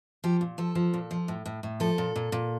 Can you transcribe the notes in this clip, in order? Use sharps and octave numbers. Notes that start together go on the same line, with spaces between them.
F3 G4
A#2
F3 A4
F3
A#2
F3
A2
A2
A2
F3 A4
A#2
A#2
A#2